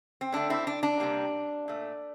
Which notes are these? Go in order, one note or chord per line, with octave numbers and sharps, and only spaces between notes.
C4
D3 A3 D4
C4 E4
D4
D4
C3 G3 A#3
A#2 A3